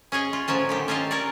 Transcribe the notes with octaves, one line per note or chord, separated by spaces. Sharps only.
C#4 G#4 C#5 D#5
F4
A2 F3 F#3 C#4 A5
D3 D#3 G4
C#4 F4 A4 D#5 F5
A#4 C#5 D5